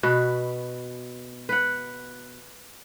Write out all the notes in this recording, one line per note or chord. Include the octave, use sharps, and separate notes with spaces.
B2 F#4 B4
B4 F#5